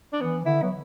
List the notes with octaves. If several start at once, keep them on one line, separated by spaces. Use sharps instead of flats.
D4
E3 B3
D3 E4
F#3 B3